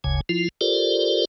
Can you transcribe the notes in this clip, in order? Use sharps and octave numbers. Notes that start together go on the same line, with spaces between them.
F#1 D2 C#3 G#5
F3 E4 F4
F4 G4 A4 A#4 C5 D5